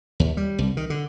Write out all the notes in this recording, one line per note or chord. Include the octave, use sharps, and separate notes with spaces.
D#2
G3
C2
D#3
D3